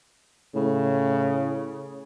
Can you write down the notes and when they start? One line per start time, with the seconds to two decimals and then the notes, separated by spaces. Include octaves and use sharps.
0.55 A2 C#3